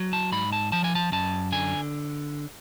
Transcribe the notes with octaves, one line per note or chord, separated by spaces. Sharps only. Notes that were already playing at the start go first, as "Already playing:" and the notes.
Already playing: F#3
A5
G#2 B5
A5
F3 A5
G#5
A5
F#2 A5
D3 G#5